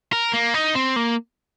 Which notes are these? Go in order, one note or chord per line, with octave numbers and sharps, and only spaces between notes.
A#4
A#3
D#4
C4
A#3